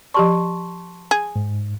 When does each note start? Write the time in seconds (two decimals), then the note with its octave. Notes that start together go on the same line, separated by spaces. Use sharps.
0.14 F3 G4 D5 A5 C6 C#6
1.11 G#4
1.36 G#2